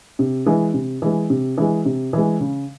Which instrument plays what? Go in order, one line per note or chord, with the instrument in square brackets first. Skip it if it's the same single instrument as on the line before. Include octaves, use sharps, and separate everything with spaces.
[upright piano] C3
E3 G#3
C3
E3 G#3
C3
E3 G#3
C3
E3 G#3
C#3